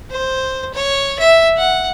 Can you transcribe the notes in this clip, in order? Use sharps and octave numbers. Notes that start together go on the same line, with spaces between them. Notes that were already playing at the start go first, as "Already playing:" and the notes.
C5
C#5
E5
F#5